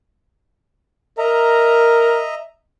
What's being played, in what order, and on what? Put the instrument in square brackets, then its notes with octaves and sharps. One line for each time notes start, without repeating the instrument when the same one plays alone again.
[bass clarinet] A#4 [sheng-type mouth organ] D#5 E5 A#5